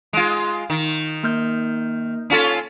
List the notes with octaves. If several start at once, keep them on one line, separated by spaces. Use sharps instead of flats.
G#3 F4
D#3
A#3 F6 G6
C#4 F4 A4